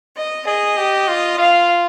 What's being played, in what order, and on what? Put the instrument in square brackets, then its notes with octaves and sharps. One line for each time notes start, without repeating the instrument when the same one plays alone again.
[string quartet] D#5
[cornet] G#4 [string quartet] D#5
[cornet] G4
F4
[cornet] F4 [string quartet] F5